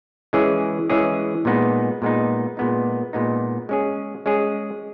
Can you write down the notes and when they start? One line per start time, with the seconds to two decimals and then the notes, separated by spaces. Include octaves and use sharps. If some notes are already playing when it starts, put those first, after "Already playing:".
0.33 E3 G#3 C#4 G#4
0.90 E3 G#3 C#4 G#4
1.45 A#2 G#3 B3 D#4
2.02 A#2 G#3 B3 D#4
2.57 A#2 G#3 B3 D#4
3.13 A#2 G#3 B3 D#4
3.69 G#3 C#4 G#4
4.26 G#3 C#4 G#4